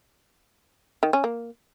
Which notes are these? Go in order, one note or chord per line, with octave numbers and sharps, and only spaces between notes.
D#3
C#4
A#3